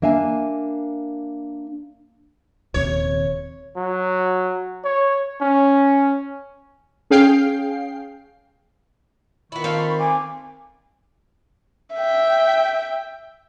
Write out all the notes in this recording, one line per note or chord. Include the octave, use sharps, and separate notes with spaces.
A#3 D4 E5 F5 G#5
D#1 D#2 C3 C#5
F#3
C#5
C#4
C#4 G#4 F5 G5 C7
D#3 B3 E4 F4 B5 C#6
C4 A4 F5
G#5 D6
E5 G5